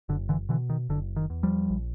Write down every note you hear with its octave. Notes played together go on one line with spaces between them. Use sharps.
F#1 D3
D3 E3
B2 D3 E3
D#3
F#1 D3
D#3
E2
F3 G3
A#1